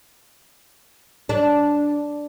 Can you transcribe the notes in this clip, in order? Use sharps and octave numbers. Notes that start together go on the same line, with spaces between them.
D4